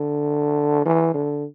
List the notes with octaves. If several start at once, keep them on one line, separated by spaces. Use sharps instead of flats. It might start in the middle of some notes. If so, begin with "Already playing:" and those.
Already playing: D3
E3
D3